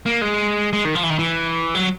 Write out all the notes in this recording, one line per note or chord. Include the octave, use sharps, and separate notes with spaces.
A#3
G#3
G#3
D#3
F3
E3
D#3
E3
F#3